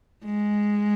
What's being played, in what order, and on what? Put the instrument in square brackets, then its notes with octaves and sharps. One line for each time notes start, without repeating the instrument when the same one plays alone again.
[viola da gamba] G#3